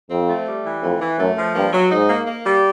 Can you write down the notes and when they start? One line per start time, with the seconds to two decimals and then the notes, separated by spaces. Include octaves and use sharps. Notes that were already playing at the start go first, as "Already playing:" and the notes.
0.11 F2 C4
0.28 A3
0.47 G3
0.65 E3
0.83 F2 A3
1.01 E3
1.19 F#2 A3
1.37 F3
1.55 G2 A#3
1.73 F#3
1.91 G#2 D#4
2.09 A#3
2.27 A#3
2.45 G3